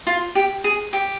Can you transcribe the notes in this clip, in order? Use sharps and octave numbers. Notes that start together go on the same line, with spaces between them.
F4
G4
G#4
G4